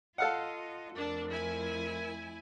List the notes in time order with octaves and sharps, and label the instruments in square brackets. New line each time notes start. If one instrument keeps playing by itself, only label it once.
[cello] F4 D#5 [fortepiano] A4 F5 F#5
[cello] F2 A3 [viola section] D4 [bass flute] A#4
[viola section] E4 G#5